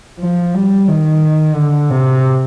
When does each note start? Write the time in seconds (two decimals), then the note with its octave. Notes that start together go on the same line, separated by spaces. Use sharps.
0.19 F3
0.54 G3
0.88 D#3
1.55 D3
1.90 C3